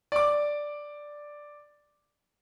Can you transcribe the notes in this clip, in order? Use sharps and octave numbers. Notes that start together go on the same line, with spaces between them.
D5 D6